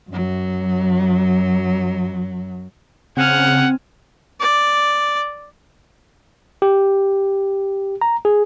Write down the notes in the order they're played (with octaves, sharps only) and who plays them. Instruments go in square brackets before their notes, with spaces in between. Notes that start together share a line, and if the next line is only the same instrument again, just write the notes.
[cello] F#2 F#3
[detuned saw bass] C#3 [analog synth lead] C4 [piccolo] F#5 [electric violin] G#5 F6
[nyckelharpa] D5
[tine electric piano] G4
A#5
G#4